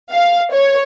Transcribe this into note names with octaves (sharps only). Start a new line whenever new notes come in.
F5
C#5